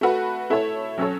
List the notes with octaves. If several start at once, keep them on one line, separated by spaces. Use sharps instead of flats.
A3 F#4 B4
A3 E4 C#5
F#3 C#4 A4 C#5